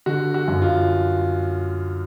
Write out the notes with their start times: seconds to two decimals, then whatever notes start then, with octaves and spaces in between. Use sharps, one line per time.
0.06 D3 F#4
0.34 F#4
0.48 F#2
0.62 F4